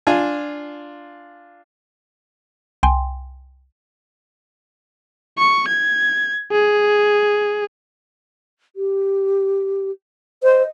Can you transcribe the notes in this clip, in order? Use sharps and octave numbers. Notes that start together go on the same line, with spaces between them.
D4 F4 G#5
C2 G5 G#5 C6
C#6
G#6
G#4
G4
C5 D#5